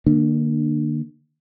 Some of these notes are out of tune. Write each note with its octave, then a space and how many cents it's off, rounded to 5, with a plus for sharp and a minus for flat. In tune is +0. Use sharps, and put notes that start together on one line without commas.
D3 +35 A#3 +0 D4 +25